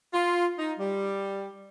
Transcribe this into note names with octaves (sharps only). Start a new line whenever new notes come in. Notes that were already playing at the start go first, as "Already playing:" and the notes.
F4
D#4
G3